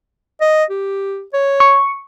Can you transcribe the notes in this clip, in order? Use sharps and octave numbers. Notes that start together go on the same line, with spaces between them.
D#5
G4
C#5
C#6